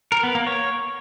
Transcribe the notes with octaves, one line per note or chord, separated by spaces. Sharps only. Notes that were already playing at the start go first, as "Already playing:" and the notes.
A#4
B3
A#3
C#5